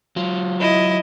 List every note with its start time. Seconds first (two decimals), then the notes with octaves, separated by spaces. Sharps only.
0.16 F#3 F4
0.60 E4 D#5